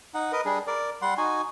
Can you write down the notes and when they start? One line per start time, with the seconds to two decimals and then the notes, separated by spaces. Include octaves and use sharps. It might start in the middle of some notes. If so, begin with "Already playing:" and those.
0.14 D#4 F#5
0.32 A#4 B4 D#5
0.45 G3 D4 G#4
0.67 A#4 D5
1.02 G3 F#5 C6
1.18 D#4 F#4 G#5